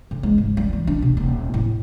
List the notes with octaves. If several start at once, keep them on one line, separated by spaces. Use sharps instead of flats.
D3
G#3
G#2
G3
E3
D4
B2
D#1
A2